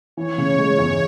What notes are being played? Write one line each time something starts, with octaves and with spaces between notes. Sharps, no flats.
E3 C#5
C#3
G#3
E2